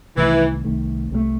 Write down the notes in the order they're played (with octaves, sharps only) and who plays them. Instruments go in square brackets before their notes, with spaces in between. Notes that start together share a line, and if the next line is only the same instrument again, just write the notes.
[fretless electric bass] C2 C3 D#3 A3 [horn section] E3
[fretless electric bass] C2 C3 D#3 A3
C2 C3 D#3 A3